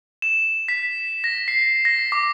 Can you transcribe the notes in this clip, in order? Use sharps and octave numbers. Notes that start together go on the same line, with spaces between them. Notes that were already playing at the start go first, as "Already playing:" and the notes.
E7
B6
A#6
C7
A#6
D6